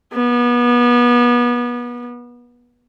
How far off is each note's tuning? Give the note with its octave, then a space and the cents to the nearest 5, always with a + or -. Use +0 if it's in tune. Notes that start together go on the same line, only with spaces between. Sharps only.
B3 -30